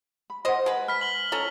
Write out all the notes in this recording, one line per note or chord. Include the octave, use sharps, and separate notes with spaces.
B5
A#4 C5 D#5 F#5
G#3 B4
B5 F6 B6
F#7 G7
C#4 A4 D#5 G5 A#5